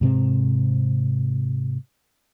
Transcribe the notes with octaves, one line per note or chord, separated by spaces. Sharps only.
G#2 C3 C4